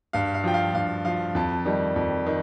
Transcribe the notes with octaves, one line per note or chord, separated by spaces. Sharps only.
G2 F5
F5
F3 G5
F5
G2 F5
F3 F5
F2 A5
D#3 G3
F2
D#3